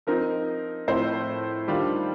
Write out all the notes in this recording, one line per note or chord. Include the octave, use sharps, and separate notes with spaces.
F3 C4 D#4 A#4
A2 F3 C4 C5
D#3 G3 D4 F4